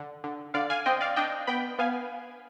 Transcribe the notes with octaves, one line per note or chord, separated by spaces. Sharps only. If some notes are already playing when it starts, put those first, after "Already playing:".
Already playing: D3
D3
D3 D5 F5
F5 G#5
C4 D#5 G5
D5 F5
D4 D#5 G5
B3 G5 B5
B3 F5 G#5